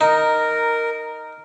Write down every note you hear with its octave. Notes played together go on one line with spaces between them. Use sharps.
D#4 A#4